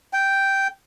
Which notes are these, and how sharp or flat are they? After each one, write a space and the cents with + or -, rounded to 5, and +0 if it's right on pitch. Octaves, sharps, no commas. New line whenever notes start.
G5 -5